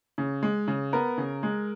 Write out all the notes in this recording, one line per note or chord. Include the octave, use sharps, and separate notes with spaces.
C#3
G#3
C#3
B3 A#4
C#3
G#3